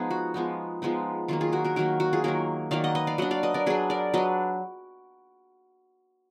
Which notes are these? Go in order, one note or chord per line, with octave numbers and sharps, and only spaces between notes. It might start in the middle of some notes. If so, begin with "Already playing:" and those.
Already playing: F3 G#3 B3 D#4 G#4
F#4
F3 G#3 B3 D#4
F3 G#3 B3 D#4
D#3 F#3 A#3 F4
F4 G#4
F#4 A#4
F#4 A#4
D#3 F#3 A#3 F#4 A#4
F#4
F4 G#4
D#3 F#3 A#3 F#4 A#4
D#3 F#3 A#3 D5 F5
D#5 F#5
B4 D#5
D5 F5
F#3 D4 D#5 F#5
D5 F5
B4 D#5
A#4 D5
F#3 D4 G#4 B4
A#4 D5
F#3 D4 B4 D#5